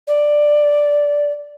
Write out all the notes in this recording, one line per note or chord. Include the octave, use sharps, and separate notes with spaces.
D5